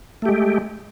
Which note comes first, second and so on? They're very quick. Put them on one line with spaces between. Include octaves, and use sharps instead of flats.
A3 G4 G#3